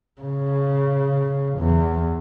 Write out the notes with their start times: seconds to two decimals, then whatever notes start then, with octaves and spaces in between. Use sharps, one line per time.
0.22 C#3
1.59 E2